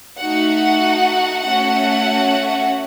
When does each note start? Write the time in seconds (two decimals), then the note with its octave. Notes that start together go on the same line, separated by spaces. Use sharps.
0.18 A3 D#4 F#4 F#5
1.44 A3 C#4 F#4 F#5